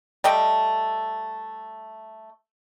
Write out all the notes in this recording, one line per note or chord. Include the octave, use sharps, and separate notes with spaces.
G3 A3 D#5 G5